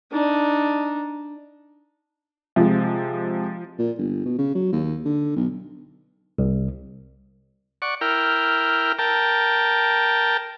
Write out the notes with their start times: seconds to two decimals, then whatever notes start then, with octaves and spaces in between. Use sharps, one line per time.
0.12 D4 D#4
2.56 C3 F3 G#3
3.78 A#2
3.98 G1
4.25 B2
4.38 C#3
4.55 F#3
4.72 D#2
5.05 D3
5.36 B1
6.38 C2
7.82 D5 F#5 C#6
8.01 E4 A#4 G5 F6
8.99 A#4 G5 A5